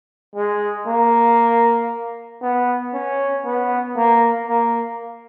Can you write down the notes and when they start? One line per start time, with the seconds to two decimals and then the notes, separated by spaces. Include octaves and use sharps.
0.36 G#3
0.88 A#3
2.42 B3
2.94 C#4
3.46 B3
3.97 A#3
4.48 A#3